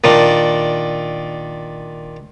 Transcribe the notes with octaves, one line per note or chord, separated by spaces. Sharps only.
A#2 D#3 D4